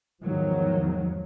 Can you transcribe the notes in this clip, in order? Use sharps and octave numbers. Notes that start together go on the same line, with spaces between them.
E2 G#2 D#3 F3 F#3